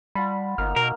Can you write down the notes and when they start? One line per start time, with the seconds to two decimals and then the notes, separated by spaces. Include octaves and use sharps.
0.15 G3 F4 F#5 A5 B5
0.58 G1 A#3 D#4 F6
0.76 B2 A#4